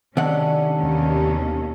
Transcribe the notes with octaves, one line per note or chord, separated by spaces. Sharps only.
C3 D#3 C#4 D4 A4 F#5
D#2 B2 C#4